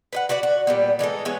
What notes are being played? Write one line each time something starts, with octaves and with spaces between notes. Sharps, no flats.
B4 D#5 F#5
F#4 B4 D5 F#5
F#4
A#2 G3 B3
E3 G#3 D#4 A4
G#3 B3 E4 C#5